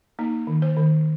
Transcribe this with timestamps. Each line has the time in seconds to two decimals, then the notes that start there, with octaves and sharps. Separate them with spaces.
0.19 A#3 D#4
0.47 D#3
0.62 C5
0.77 D#3